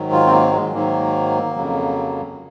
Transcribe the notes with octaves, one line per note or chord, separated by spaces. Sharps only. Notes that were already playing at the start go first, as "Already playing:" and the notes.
Already playing: G#2 D#3 F#3
F4
C4
A#3
G#3
G#2 D#3 F#3 A#3
F2 C#3 F#3